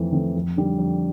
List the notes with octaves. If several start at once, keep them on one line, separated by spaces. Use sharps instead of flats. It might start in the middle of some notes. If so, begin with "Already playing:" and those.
Already playing: F2 E3 A3 C4
E3 A3 C4
F2
D3 G3 D4
F2